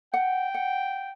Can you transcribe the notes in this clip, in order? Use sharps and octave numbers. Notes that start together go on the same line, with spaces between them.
F#5 G5
F#5